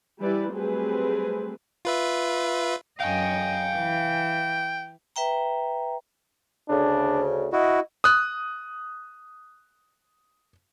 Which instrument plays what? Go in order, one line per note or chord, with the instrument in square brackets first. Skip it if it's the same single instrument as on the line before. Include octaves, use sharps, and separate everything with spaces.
[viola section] E3 G3 E4 G4 B4 D5
F#3 G3 A3 C4 G#4 B4
[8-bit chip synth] F4 B4 E5
[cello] F#2 D#5 [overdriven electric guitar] F5 G#5 [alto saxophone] G5
[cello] E3
[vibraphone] B4 E5 G5 A#5
[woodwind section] D2 C#3 [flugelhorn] D4
[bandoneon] E4 F#4 [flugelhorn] D#5
[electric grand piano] D#6 F#6